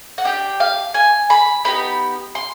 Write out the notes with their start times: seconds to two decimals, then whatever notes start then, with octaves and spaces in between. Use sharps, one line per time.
0.18 F#5
0.24 D4 G4 G5
0.60 F5
0.94 G#5
1.30 B5
1.65 B3 D#4 G4 B5
2.35 C6